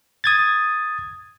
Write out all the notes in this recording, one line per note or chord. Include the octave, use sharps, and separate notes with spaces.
D#6 G#6 A6